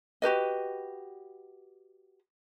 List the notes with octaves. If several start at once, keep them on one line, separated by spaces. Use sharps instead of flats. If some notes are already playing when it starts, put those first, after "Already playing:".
F#4 G4 B4 D#5